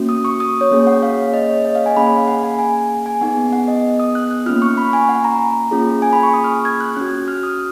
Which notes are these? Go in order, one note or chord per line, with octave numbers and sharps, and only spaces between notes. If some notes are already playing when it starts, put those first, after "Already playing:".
Already playing: A#3 C#4 F#4
D#6
C#6
D#6
C#5
A#3 C#4 G#4
F#5
F5
D#5
C#5
D#5
F5
G#5
A#3 C#4 G#4 B5
G#5
F5
F#5
G#5
G#5
G#5
B3 D#4 G#4 F#5
F#5
D#5
D#6
F#6
F#6
A#3 C#4 F4 F6
C#6
B5
G#5
F#5
A#5
A#3 C#4 F4 G#4
G#5
B5
C#6
D#6
F6
G#6
F#6
C#4 F#4 F#6
F6
D#6